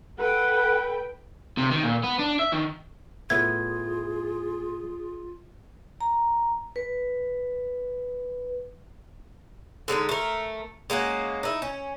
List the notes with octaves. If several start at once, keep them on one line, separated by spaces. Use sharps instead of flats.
A4 B4 F#5 G5
C3
D#3
A#2
B3
D4
E5
D#3
A2 B3 F4 G#4 E5 G#6
A#5
B4
D3 G#3 C#4 D#4
A3 A#4
G#3 A#3 C#4 F#4
D#4 E4
C#4